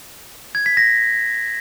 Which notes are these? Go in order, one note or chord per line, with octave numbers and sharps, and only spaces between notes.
G#6
B6
A#6